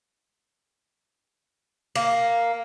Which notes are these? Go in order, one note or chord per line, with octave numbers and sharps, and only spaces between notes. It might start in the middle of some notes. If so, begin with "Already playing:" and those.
A#3